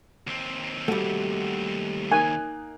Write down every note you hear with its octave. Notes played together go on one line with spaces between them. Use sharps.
D#2 C4
G3 A3 F#4 F#5
A#3 D#4 G#5 F#6